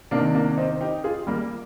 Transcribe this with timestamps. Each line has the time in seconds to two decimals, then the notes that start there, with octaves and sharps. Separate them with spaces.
0.11 C3 A#3 D4
0.14 D#3
0.34 A#3 D4
0.58 C4 D#4
0.81 D#4 G4
1.04 F4 G#4
1.27 G3 A#3